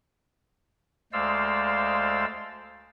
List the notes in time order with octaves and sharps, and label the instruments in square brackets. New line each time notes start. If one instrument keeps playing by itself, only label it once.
[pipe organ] D2 G#3 C5 D5 F5 E6